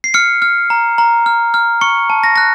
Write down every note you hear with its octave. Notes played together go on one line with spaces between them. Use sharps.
C7
F6 C#7
F6
A#5
A#5
F6
F6
C#6 C#7
A5
A#6
F#6 A#6